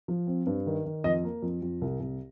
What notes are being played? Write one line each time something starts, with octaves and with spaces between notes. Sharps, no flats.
F3
C4
G2
D#3
D#3
F2 D#5
A#3
F2
F2
C2
C2